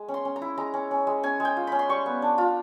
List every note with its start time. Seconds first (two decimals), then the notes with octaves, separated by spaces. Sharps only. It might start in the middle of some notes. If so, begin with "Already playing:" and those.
Already playing: G#3
0.08 C#4
0.14 C6
0.25 C#4
0.36 A#5
0.42 E4
0.58 G#3 A#5
0.74 C#4
0.91 C#4
1.07 G#3
1.23 C#4 G#5
1.40 G#3 G5
1.57 F4
1.67 C#4 B5
1.79 C6
1.89 G3 C#6
2.06 B3
2.22 D4
2.38 F4